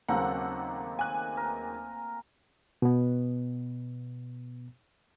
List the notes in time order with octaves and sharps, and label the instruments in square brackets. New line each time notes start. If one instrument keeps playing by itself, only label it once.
[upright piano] D#2 C#3 F#3 [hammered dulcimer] A3 A#3 C4 [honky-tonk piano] F#5
[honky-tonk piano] G#5 F#6
[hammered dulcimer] A#4
[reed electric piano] B2 B3